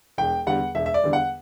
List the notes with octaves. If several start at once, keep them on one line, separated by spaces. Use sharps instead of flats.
E1 G5
E2 D3 G3 F#5
E1 E5
E5
D5
E2 D3 G3
F#5